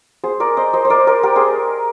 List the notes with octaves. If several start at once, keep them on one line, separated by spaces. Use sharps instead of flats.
G#4 C5
A#4 D5
C5 D#5
C5 D#5
C5
A#4 D5
A#4 D5
G4 A#4
G#4 C5